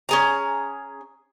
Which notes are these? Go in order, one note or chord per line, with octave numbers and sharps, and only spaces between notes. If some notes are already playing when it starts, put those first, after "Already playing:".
C#4 G#4 A#5